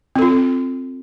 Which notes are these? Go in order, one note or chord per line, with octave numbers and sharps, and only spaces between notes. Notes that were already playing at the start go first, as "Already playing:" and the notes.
C4 F4 A4